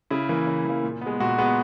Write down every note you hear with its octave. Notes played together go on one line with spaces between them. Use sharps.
C#3 E4
E3 A#3
C#3
E3 A#3
A#2
G#3 B3
A#2 F#4
G#3 B3